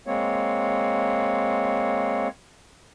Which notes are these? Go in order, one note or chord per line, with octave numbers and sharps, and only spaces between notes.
G#3 A#3 C4 C#5